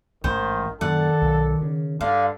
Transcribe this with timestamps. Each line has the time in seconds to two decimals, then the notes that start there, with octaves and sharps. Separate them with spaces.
0.24 A1 G#2 D#3 E3 C5
0.81 F#2 A#2 D#3 A4 D5 F#5
1.21 B1
1.61 C#3
2.01 G2 D3 F5